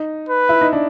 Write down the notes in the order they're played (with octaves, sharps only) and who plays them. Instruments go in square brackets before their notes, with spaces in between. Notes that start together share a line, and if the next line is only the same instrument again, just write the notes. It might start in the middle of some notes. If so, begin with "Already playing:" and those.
Already playing: [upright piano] D#4
[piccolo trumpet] B4
[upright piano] E4
D#4
D4